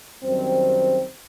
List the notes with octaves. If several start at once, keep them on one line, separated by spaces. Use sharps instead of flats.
F#2 D#3 G3 C4